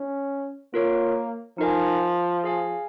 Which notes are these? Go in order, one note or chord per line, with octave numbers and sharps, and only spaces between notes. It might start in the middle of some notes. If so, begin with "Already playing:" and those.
Already playing: C#4
A#3 F4 A#4 C#5
F3 D#4 A#4 D#5 G#5
G#4 F5 G#5